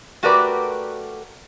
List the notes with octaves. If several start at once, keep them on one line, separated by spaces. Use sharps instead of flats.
A3 F#4 G4 A#4 B4 D5